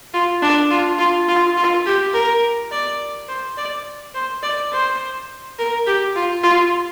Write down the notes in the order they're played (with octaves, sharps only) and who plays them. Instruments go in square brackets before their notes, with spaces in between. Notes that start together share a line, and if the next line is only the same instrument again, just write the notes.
[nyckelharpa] F4
D4
F4
F4
F4
F4
G4
A#4
D5
C5
D5
C5
D5
C5
A#4
G4
F4
F4